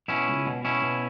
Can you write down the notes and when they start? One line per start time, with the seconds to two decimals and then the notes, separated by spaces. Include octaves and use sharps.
0.08 B2 C#4 E4
0.28 C#2
0.47 B2
0.65 B2 C#4 E4
0.83 B2